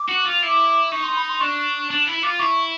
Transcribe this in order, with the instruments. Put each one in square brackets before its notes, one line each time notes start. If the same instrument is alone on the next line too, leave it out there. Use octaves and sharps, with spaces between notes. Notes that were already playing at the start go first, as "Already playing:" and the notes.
Already playing: [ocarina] D6
[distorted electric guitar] F#4
F4
E4
[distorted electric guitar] D#4 [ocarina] C#6
[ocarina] C6
B5
C6
[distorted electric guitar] D4 [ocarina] C#6
[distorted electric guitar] D4
E4
[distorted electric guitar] F4 [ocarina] D6
[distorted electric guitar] E4 [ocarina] C#6